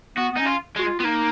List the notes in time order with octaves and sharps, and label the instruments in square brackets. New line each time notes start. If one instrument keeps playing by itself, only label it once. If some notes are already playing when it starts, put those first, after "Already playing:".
[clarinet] B3 [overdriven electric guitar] F#4
[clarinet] B3
[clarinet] C#4 [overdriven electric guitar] D#4
[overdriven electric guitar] F4
[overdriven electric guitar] G#3 [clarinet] F#4
[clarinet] F4
[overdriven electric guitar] B3 [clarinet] F4
[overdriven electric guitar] A#3 [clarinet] D#4